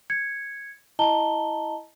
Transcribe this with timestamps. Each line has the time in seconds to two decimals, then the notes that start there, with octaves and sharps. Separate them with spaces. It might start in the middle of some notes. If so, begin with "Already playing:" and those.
0.10 G#6 C#7
0.99 E4 D#5 A5 A#5 G7